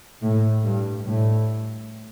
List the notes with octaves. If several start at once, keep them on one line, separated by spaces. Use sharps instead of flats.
A2
G2
A2